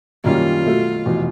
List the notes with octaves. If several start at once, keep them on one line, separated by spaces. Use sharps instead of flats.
F#2 D#3 G3 A#3 C#4 F4
B2 F#3 A3
F1 E2 B2